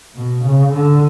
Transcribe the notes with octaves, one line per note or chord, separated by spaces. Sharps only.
B2
C#3
D3